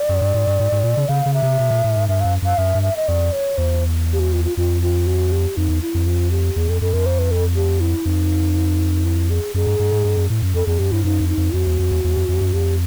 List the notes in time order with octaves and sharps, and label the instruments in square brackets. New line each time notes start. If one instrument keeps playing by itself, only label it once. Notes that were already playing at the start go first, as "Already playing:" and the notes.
Already playing: [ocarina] D5
[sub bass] F#2
G2
G#2
G2
G#2
G#2
A#2
C#3
[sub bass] C#3 [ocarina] F5
[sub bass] C#3
[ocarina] E5
[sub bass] C3
B2
A#2
A2
G#2
[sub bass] G2 [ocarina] E5
[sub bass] F#2 [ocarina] F5
[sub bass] F#2 [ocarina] F5
[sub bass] F#2 [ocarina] E5
[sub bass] G2
[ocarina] E5
D#5
[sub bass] F2 [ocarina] D5
[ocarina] C#5
[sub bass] E2 [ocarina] C5
[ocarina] G4
F#4
F4
F4
[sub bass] F2 [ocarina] F4
[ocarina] F4
F#4
G4
[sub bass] F2 [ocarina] D#4
[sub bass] E2
[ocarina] E4
[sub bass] F2
[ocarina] F4
G4
[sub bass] E2 [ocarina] G#4
[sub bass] F2 [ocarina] A4
[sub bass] F#2 [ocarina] A4
[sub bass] F2 [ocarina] A#4
[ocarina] C5
B4
A4
G4
E4
[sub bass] F2 [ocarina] D#4
[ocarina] E4
G#4
[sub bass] F#2 [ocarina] G#4
[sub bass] G2
G2
G#2
G2
F#2
A2
F#2
[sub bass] F2 [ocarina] A4
[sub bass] F2 [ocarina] G#4
[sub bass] F#2 [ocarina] G4
[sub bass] G2 [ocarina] E4
[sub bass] F#2 [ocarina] D#4
[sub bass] F2
[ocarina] D#4
[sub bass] F2
[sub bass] F2 [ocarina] F#4
[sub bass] E2
F2
E2
E2
F2
F2
F#2
[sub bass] F2 [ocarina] G4